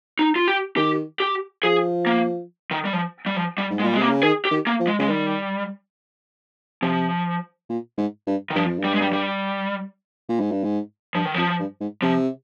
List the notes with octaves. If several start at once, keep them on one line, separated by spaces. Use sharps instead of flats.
D#4
F4
G4
D#3 G4
G4
F3 G#4
A#3
D#3
G3
F3
G3
F3
G3
G#2
G#3
A#2 G3
G#3
C3 A#3
C#3
D#3 G#4
G4
D#3
A#3
F3
G#3
C#3 G#3
D#3 G3
C3 F3
A#2
G#2
G2
D#3
G2 F3
F2
G2
G3
G#3
G3
G3
A#2
G#2
G2
G#2
G2 F3
D#3
F2 F3
G2
G#2
C3 F3